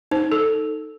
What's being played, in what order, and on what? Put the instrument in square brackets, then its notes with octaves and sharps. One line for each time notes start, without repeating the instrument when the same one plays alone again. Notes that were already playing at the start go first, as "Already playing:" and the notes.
[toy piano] D#4 [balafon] C5
[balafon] A4